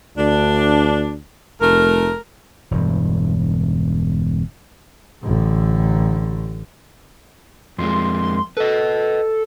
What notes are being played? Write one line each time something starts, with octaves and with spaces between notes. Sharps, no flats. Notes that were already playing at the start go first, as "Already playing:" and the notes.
D2 D4
F1 A3 A#4
E1 G2
A1 D3
F2 F3 G#3 C6
A4 B4 D#5